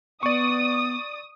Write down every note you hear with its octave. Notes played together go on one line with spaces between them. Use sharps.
B3 D5 C#6 D#6